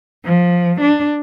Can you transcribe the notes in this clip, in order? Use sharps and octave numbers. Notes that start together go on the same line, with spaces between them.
F3
D4